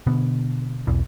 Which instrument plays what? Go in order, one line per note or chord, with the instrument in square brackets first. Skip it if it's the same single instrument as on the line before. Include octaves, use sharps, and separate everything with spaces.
[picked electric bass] B2 D3 B3
B1 E2 E3